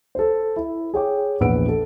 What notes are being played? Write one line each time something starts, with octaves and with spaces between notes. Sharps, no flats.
A4 C5
E4
G#4 C#5 G5 D6
A#1 E2 B4 F#5 E6 D7
A4